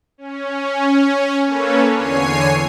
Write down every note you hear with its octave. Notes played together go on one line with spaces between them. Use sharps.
C#4
A#3 C#4 A4 B4 C#5
E2 D3 C#5 G#5 C7 D#7